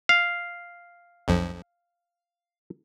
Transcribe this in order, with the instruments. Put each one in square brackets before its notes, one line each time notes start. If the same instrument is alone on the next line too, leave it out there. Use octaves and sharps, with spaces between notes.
[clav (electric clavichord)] F5
[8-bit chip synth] B1 F2 F3